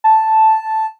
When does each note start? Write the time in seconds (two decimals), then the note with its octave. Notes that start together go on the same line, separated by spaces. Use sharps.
0.04 A5